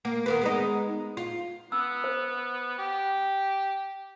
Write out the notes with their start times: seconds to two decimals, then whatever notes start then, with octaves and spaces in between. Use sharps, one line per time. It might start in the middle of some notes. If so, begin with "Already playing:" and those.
0.05 A#3
0.26 D#3 A#3 B3
0.42 G#3 B3 D#4
1.17 F4
1.72 B3 E6
2.04 C5
2.78 G4